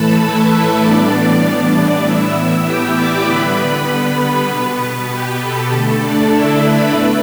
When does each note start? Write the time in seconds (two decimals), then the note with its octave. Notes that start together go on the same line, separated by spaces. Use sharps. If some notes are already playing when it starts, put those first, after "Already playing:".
Already playing: A2 E3 A3 A4 B4 A5 B5
0.20 E4 E5
0.81 A2 E3 G3 B3 D4 D5
2.03 A2 E3 B3 E4 E5
2.34 E4 E5
2.64 G4 G5
2.95 D5 D6
3.25 D3 G3 B3 B4 B5
3.56 B4 B5
3.86 B3 B4
4.47 B2 B3
5.08 G4
5.39 A4
5.69 D3 A3 A4
6.00 D4 D5
6.30 E4 E5
6.60 B4 B5
6.91 A2 B3 B4